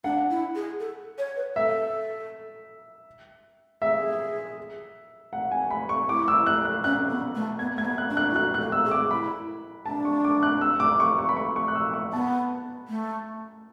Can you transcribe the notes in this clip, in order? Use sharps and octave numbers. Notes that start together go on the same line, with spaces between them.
D4 F#5
E4
G#4
A4
C#5
B4
A4 E5
G#4 E5
F#5
G#5
B5
C#6
E4 D6
E6
F#6
F#6
C#4 F#6
B3
A3
B3 G#6
A3 G#6
B3
F#6
D4
F#6
E4
F#4 F#6
F#6
A4
E6
G#4
D6
E4 B5
D4 A5
C#6
D6
F#6
E6
D6
C#6
C#6
B5
C#6
C#6
F#6
E6
C#6
B3 A5
A3